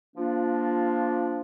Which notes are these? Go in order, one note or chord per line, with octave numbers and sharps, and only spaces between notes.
F3 A#3 D4 F4